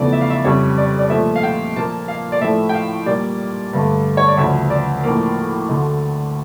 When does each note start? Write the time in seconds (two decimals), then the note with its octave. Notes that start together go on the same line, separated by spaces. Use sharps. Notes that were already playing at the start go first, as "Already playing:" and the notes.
Already playing: E2 C#3 F3 A3 D5
0.13 E5
0.21 F5
0.30 E5
0.45 F2 C#3 G3 C#5
0.78 D5
0.99 D5
1.10 A#2 F3 A3 E5
1.36 F5
1.43 G5
1.76 A#2 F3 A#3 A5
2.08 F5
2.32 D5
2.41 A2 F3 A3 E5
2.69 G5
2.74 F5
3.06 A#2 G3 A#3 D5
3.73 G2 D3 A3
4.17 C#5
4.28 D5
4.37 D2 C#3 F3 E5
4.70 D5
5.03 A2 F3 A#3
5.69 D2 D3 A3